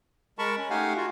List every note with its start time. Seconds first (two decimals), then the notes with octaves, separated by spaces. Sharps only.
0.39 G#3 A#4 A5 B5 C#6
0.57 C#4
0.70 A3 D#4 G4 F5 F#5 G#5
0.97 F4 F#4